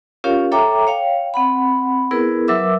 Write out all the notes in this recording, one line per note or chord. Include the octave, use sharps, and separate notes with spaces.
C#4 F4 G4 A#4 C#5 F5
A4 C#5 E5 G5 A#5 D6
C#5 F5 G5
C4 F#5 B5
B3 E4 G#4 A#4 B4
F#3 A#4 B4 E5 D6 E6